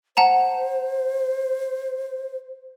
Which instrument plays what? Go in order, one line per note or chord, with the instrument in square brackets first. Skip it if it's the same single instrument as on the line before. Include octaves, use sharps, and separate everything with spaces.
[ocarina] C5 [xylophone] F#5 A5 A#5